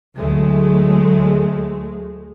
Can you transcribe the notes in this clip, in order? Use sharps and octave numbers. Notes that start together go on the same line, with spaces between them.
D2 F#3 G#3 A3